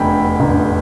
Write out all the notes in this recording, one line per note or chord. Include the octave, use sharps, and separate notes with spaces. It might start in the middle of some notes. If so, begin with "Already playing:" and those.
Already playing: F1 E2 D3 G5 B5
F1 E2 D3